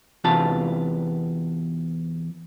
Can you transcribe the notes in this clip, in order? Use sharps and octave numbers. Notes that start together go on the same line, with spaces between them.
E2 C3 B3 F4 A5